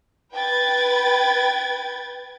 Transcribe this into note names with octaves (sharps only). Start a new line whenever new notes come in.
B4 G5 G#6 A6